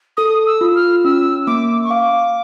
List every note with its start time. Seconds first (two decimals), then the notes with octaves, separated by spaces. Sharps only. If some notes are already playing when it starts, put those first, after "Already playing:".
0.17 A4 D#6
0.46 E6
0.61 F4
0.75 F6
1.04 C#4 E6
1.47 A#3 D6
1.84 C#6
1.90 F5 D6